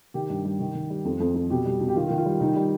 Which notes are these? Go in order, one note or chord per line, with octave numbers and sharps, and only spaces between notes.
D#3 G4
G2
G3
D#3
D#3
G3
F2
F2
F2
B2 G4
G3
B2
G4
D#3 F4
F4
D#3
F4
G3
D#3 D#4
G3